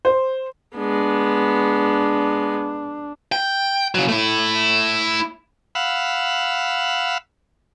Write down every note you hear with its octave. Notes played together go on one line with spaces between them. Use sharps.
C5
G#3 B3 D4
G5
C#3 F#3
A3 E4
F5 F#5 B5 E6